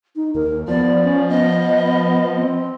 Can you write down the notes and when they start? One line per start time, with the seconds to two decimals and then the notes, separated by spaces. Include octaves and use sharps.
0.16 D#4
0.35 D#2 A#4
0.68 F3 B3 D5
1.03 C#4
1.29 B3 D#5
2.36 C4